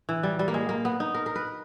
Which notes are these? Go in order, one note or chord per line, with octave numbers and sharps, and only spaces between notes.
E3
G3
G3
A#3
G#3
A#3
B3
D#4
A#4
A#4
B4